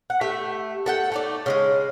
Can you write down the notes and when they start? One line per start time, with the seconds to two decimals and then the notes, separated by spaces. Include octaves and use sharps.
0.10 F#5
0.21 A3 G4 E5
0.86 A4 F#5 G5
1.12 A3 D#4 D5
1.46 C#3 G3 G#3